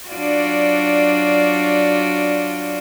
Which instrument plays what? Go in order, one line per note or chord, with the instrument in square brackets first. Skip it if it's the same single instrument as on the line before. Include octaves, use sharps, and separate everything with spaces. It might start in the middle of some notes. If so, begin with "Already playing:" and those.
[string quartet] F#3 D4 F4 F#4 D5